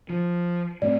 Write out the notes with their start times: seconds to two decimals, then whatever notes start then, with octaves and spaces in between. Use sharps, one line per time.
0.10 F3
0.82 A2 A3 C4 D5